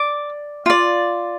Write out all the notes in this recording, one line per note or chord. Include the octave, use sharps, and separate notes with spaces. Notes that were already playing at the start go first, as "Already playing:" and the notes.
Already playing: D5 D6
F4 D5